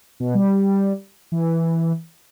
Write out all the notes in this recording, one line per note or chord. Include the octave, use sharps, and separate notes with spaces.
B2
G3
E3